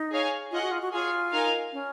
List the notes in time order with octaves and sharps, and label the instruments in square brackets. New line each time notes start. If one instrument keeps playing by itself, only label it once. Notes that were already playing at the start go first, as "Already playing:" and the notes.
Already playing: [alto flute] D#4
[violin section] G#4 C#5 F5 G#5
[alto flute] F4 [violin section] G#4 D#5 F#5
[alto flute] F#4
F4
F#4
[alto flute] F4 [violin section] G#4 C#5 G#5
[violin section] D#4 A#4 F5 G#5
[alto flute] C#4